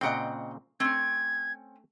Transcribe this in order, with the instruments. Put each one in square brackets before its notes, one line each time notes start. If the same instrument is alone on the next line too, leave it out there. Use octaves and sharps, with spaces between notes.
[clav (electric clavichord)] A#2 C#3 C4 [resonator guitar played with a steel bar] D#5 F#5 G5
[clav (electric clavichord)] A3 [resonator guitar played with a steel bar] C4 C#4 [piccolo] G#6